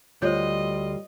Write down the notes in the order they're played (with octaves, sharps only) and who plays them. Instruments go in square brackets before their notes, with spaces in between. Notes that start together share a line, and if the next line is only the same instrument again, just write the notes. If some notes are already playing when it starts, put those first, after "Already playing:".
[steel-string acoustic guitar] D2 F4 [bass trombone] G3 [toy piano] C5 C#5 [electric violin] D#5